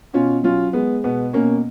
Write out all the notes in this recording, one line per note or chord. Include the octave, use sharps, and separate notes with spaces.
B2 C#4 F4
F#3 C#4 F4
G#3 B3
B2 B3
B2 A#3 C#4